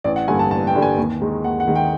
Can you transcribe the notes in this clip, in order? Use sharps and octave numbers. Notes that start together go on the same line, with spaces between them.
A1 D5
F#5
G2 D3 G3 A#3 G#5
A5
A1 A5
G5
G2 D3 G3 A#3
G#5
D#2
D#3 G#3
D#2 F#5
F#5
D#3 G#3
G5